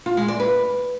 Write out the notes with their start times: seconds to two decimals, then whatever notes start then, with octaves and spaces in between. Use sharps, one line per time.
0.06 F4
0.17 G#3
0.28 D5
0.40 B4